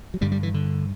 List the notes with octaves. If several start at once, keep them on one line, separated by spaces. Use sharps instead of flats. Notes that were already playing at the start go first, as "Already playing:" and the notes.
F#3
G2 D3 G3
G3
E3
D3